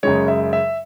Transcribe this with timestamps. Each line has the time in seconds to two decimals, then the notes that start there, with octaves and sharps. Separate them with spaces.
0.03 F#2 C#3 G#3 C#5
0.28 E5
0.53 E5